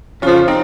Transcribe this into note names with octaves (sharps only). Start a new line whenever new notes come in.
F2 C#3 F3 C#4 F4
C4 D#4